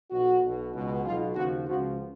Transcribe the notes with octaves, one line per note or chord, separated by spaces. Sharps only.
B1 B2 F#4
B1 B2
C#2 B2
B1 B2 F4
D#2 C#3 F3 F#4
C#2 C#3 F3 F#4